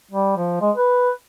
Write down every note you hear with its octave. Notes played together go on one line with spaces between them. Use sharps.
G3
F3
G#3
B4